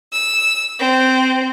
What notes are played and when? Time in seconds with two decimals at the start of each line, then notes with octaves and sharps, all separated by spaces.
0.12 E6
0.79 C4